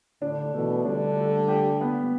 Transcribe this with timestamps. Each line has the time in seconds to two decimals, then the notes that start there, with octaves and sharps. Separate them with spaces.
0.21 A2 D3 D4
0.54 B2 E3 A3
0.85 D3 G3 D4
1.17 A3
1.48 G4
1.81 B3